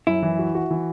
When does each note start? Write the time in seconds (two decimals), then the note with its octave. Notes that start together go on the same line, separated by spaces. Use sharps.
0.07 F#2 E4
0.23 E3
0.39 F#4
0.55 F#4
0.71 E3